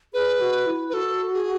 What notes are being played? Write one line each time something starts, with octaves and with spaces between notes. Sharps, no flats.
G#4 B4
F#4
E4
B4
F#4 A4
G#4